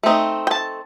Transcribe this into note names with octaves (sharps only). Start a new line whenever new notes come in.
A3 C4 D#4
G5
A5